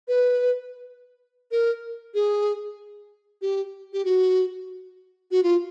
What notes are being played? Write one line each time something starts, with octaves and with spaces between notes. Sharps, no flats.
B4
A#4
G#4
G4
G4
F#4
F#4
F4